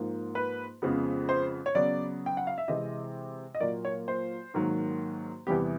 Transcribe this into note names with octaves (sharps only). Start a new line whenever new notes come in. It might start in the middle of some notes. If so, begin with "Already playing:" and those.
Already playing: G#2 F3 A#3
B4
F2 C#3 F3 G#3 B3
C5
C#5
C#3 F#3 B3 D5
G5
F#5
F5
E5
C3 E3 G#3 C4 D#5
D#5
A#2 F#3 A#3 D5
C#5
C5
G#2 D#3 F#3 A#3
E2 C3 E3 G3 B3 G4